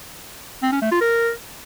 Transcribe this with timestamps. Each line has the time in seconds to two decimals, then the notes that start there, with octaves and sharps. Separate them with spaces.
0.62 C4
0.72 C#4
0.82 A3
0.91 F4
1.01 A#4